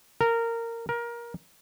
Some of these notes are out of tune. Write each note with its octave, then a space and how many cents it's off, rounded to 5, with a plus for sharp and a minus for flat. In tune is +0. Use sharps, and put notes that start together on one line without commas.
A#4 -15
A#4 +20